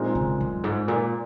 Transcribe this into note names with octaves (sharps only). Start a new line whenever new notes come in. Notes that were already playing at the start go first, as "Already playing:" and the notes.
Already playing: A#2 G#3 C4 D#4 A#4
C#3
F#2
G#2
A#2